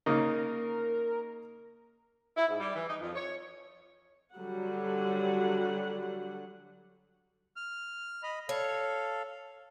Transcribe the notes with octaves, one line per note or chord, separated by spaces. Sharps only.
C#3 A#3 D#4 A#4
E4
G#2
G3
E3
D#4
F2
C#5
D3 F#3 G3 F#5
F6
D#5 B5
A4 C#5 F5